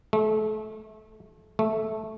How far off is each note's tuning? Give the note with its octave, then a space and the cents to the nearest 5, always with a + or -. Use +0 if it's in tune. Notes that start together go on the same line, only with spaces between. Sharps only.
A3 -30
A3 -10